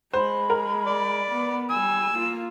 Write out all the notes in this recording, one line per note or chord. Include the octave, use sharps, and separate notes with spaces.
G#3 C5 B5
A#4
D5
B3
G3 G#5 E6
A#3 F4